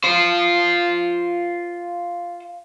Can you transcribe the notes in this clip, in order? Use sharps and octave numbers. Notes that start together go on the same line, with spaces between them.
F4 C5